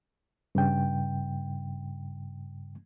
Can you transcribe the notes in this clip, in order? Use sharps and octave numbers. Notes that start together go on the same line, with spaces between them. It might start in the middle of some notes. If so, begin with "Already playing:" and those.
G2 C#3 G5